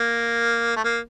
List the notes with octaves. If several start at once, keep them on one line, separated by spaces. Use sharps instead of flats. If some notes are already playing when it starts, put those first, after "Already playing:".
Already playing: A#3
A3
A#3